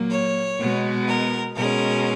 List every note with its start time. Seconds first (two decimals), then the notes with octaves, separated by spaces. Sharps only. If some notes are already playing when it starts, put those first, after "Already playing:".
Already playing: A#2 F#3 A#3
0.11 C#5
0.59 B2 G#3 B3
1.08 A#4
1.56 B2 G#3 C#4 A#4